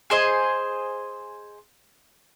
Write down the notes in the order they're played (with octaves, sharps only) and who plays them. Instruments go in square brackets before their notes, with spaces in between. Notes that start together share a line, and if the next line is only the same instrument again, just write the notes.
[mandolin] G#4 C5 D#5